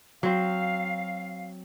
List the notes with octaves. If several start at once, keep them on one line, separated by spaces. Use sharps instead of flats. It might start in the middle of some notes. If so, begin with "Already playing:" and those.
F#3 C4 F5